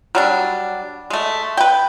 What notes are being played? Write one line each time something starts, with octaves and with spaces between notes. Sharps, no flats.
F#3 G3 D4
G#3 A3
B4 G5